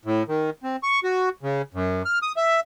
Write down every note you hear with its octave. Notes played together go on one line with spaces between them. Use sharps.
A2
D#3
C4
C#6
F#4
C#3
F#2
F6
D#6
E5